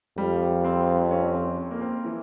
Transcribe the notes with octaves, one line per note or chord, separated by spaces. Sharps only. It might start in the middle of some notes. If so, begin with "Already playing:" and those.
F2 G3
C4
C#4
C4
C4
A#3
C4
E3